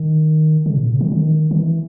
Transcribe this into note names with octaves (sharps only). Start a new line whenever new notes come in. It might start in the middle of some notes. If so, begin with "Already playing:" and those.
Already playing: D#3
C#3
A#2
C#3
D#3
D#3
D#3
E3